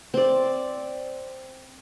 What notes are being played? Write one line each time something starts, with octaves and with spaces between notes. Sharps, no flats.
C4 D5